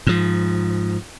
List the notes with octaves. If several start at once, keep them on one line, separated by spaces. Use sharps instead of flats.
G#2 F3